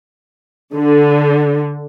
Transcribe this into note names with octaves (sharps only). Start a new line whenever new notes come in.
D3